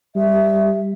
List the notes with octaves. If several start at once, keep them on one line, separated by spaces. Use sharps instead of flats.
G3 E5